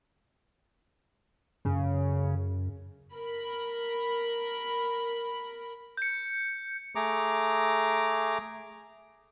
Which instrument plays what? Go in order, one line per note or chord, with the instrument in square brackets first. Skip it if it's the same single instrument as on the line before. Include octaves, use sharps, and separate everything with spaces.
[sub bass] F#2 [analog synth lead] C#3
[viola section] A#4 B5
[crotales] G6 C#7
[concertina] A3 G#4 A#5 D6